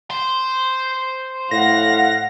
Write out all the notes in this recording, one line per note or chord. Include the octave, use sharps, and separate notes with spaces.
C5 C6
A2 F5 F#5 A#6